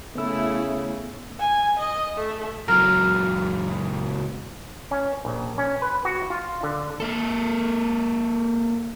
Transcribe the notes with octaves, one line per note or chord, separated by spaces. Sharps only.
C#3 A3 B3 E4 E6
G#5
D#5
A3
C#2 F#3 A#4
C#4
A#1
C#4
B4
F#4
F4
D3
A#3 A4